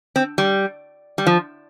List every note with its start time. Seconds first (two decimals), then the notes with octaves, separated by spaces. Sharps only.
0.16 C4
0.38 G3
1.18 G3
1.27 F3